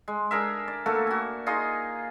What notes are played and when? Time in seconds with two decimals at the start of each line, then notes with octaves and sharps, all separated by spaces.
0.08 G#3
0.31 D4 G#4 A#4 E5
0.68 D5
0.86 A3 A#3 F#4 A4
1.07 F#4 G#5
1.47 D#4 F4 G#4 D#5